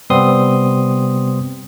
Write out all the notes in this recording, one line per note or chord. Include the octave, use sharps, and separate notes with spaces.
C3 G3 B3 C4 C6 D#6